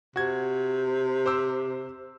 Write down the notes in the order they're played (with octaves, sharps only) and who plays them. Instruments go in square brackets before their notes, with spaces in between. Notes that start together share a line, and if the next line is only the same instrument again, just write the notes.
[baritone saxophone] C3 [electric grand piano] F#4 G#6
[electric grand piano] C5 D6 E6